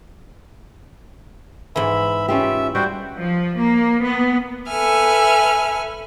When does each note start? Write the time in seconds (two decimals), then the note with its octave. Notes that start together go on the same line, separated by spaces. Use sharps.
1.76 G#2 E3 E5 B5
2.28 C#4 F4 G4 E5
2.75 G3 F#4 C5 G5
3.18 F3
3.56 A#3
4.02 B3
4.69 A4 B4 E5 G#5 F6